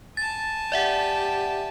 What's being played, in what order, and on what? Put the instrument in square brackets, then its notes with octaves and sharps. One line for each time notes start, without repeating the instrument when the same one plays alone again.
[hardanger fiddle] G#5 A5 [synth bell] A6
[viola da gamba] G4 [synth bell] D5 E5 F#5